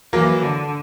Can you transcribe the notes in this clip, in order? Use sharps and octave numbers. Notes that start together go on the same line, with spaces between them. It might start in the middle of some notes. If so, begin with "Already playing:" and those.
E3 F#3 A#3
D3